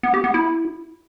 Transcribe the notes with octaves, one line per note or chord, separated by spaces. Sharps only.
B3
G4
B3
E4